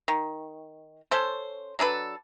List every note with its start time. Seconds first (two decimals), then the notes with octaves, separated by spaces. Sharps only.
0.08 D#3
1.11 C#4 A4 C5
1.79 F#3 D4 A4 B4